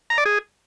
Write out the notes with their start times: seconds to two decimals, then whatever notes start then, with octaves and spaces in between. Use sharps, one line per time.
0.10 A#5
0.18 D5
0.26 G#4